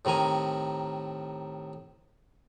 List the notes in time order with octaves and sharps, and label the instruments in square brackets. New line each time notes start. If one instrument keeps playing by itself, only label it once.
[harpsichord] A2 C3 D#3 A#4 G#5